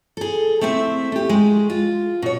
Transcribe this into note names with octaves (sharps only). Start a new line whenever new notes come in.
G#4 A4
A3 C4 E4 E5
A3 G4
G#3
F4
B2 C#5